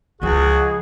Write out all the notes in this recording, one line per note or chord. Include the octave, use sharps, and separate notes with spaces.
C#2 C#3 F3 F#4 G#4